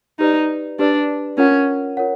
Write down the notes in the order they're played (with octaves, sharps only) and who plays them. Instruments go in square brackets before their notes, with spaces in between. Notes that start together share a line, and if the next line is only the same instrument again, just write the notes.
[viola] D#4 [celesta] G4 B4 D5
[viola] D4 [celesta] G4 B4 D5
[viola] C#4 [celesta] F4 A#4 C#5 F#5
[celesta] F4 A#4 C#5 F#5